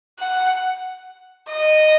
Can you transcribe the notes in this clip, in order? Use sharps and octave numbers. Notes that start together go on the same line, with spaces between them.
F#5
D#5